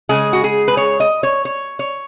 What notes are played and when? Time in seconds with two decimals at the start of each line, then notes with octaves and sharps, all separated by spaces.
0.09 C#3 G#3 G#4
0.33 F#4
0.44 G#4
0.68 B4
0.77 C#5
1.00 D#5
1.23 C#5
1.45 C#5
1.79 C#5